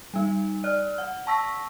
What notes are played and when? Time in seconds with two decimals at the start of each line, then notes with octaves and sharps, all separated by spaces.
0.14 G3 D#4
0.64 D5 F6 F#6
0.98 F#5
1.27 A5 C#6 E6 A#6 B6